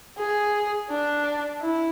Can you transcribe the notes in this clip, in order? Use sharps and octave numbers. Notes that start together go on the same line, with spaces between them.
G#4
D4
E4